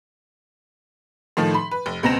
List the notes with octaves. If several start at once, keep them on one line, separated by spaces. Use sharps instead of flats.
A2 D#3 F3 A3
B5 C6
B4
F1
C#2 B2 C4 A#5 A#6 E7